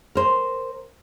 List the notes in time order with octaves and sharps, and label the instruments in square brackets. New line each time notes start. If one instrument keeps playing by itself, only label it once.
[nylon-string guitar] A#4 C5